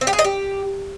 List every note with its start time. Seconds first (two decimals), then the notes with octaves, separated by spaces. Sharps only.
0.01 C4
0.07 G4
0.13 G#4
0.19 D#5
0.24 G4